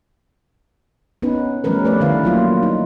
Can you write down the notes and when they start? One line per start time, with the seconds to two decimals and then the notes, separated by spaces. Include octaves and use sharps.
1.22 B3 C#4 D#4 B4
1.64 F3 G3 A3 C#4 A#4 B4
1.85 A3 B4 D5
2.00 D3 D#3 D4 E4 B4 F5
2.24 F#3 A#3 F4
2.63 D#4